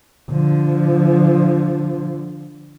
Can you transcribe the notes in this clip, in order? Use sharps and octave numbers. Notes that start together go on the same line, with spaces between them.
D3 F3